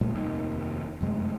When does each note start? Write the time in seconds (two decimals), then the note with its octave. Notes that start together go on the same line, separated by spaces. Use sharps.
0.01 A#2 G3 A3
0.13 F1 D#2 D#3
1.01 F1 F#2 G#3 A3